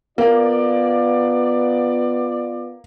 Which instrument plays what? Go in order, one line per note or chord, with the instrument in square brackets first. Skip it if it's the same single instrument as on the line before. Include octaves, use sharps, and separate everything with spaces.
[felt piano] A#3 [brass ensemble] B3 F4 D5